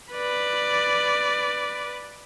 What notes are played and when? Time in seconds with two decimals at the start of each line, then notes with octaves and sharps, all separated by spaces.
0.13 B4 D5